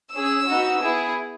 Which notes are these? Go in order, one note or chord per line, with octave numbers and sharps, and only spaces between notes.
C#4 G#4 E6
B3 D#4 F#4
B3 E4 G#4